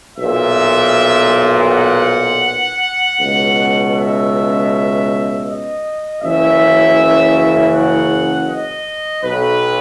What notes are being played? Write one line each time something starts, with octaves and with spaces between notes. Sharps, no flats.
B1 A#2 E5
F#5
C#2 B2
E5
D#5
F#1 F#2 C#3 E3 E5
F#5
D#5
B1 B2 B4